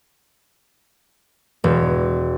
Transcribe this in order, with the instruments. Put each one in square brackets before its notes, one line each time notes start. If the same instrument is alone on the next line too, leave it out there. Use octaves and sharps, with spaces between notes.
[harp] E1